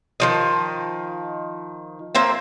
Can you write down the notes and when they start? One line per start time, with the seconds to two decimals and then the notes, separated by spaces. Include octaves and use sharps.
0.20 D#3 F3 D#5
2.15 F3 A#3 C4 E5